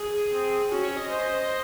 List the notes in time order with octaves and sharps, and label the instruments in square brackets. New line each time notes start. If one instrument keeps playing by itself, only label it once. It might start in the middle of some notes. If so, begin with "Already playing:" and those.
Already playing: [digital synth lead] G#4
[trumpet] C4
[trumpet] C#4 [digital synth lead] F#4
[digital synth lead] C#5
D#5
[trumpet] C5